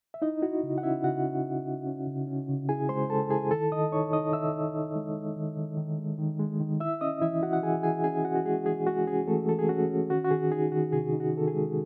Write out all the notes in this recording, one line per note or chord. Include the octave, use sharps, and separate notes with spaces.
E5
D#4 E4 D#5
E4 F#4
C#3
F#5
C#4 E4 E5
C#3 F#4 F#5
C#4
E4
E4
C#4
C#3
C#4
C#3
E4 G#4 G#5
G#3 C5 C6
G#3 A4 A5
E4 G#4 G#5
D#3 A4 A5
D#3 D#5 D#6
D#4 C#5 C#6
D#4 D#5 D#6
D#3 E5 E6
D#4
D#4
G#3
G#3
D#3
D#3
D#3
G#3
D#3
G#3
D#3
E4 E5 E6
C#4 D#5 D#6
E3 E4 E5
E4 F#4 F#5
F#5
E3 G#4 G#5
E3 G#4 G#5
C#4 G#4 G#5
C#4 F#4 F#5
F#4
G#3 G#4
E3 G#4
G#3 F#4
C#4 G#4
E3 A3 A4
E3 A4
G#4
C#4 F#4
C#4
D#3 F#4
F#4
D#3 G#4
D#4 G#4
D#3 F#4
C3 G#4
D#4
F#4
D#3 A4
G#4
G#3